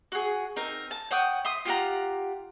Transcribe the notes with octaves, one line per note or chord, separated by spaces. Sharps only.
F#4 G#4
C4 D#4 A#4
A5
C#5 F#5 G5 D#6
E5 C6 D#6
F4 G4 F#5 A#5